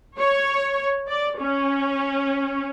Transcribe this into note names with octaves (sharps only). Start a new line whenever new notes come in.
C#5
D5
C#4